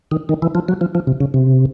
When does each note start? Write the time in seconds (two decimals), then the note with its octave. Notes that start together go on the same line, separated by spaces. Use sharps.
0.11 D#3
0.29 D#3
0.42 E3
0.55 F3
0.68 F#3
0.81 F3
0.95 F3
1.07 C3
1.20 C#3
1.34 C3